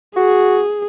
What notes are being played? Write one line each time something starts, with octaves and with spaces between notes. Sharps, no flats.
F#4 G#4